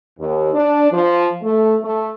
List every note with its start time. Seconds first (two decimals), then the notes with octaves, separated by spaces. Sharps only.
0.18 D#2
0.52 D4
0.90 F3
1.41 A3
1.81 A3